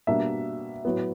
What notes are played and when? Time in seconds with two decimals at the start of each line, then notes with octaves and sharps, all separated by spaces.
0.07 B2 G3 A#3 D4 E5
0.85 A2 F#3 B3